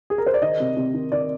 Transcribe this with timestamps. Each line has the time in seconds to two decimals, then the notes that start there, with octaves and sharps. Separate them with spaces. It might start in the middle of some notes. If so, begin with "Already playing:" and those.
0.10 G#4
0.18 A#4
0.26 C5
0.34 D5
0.42 D#3 D#5
0.60 C3
0.77 C3
0.94 D#3
1.12 D#3 D5